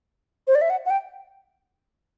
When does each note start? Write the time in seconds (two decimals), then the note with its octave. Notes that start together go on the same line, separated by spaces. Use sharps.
0.47 C5
0.55 D5
0.61 E5
0.70 F#5
0.86 F#5
0.90 G5